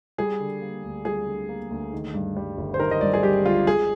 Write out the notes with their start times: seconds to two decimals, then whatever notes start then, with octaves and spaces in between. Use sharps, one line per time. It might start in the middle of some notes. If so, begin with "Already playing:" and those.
0.18 G3 G#4
0.40 D3
0.62 A#3
0.83 D2
1.05 G3 G#4
1.27 D3
1.49 A#3
1.70 D2
1.93 D#3
2.14 G2
2.37 G3
2.57 G1
2.74 C5
2.80 D#3 A#4
2.91 D#5
3.01 G2 D5
3.13 G#4
3.23 G3 G4
3.45 G1 F4
3.67 G#3 G#4